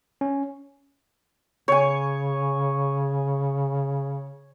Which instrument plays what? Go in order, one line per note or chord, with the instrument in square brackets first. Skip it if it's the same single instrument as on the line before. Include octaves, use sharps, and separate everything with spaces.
[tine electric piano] C#4
[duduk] C#3 [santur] C#5 G#5